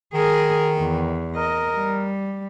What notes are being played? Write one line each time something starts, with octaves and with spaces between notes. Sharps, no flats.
D#3 G#4 A#4
E2
A#4 D#5
G3